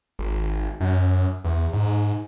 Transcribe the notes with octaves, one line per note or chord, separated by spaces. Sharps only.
G#1
F#2
E2
G#2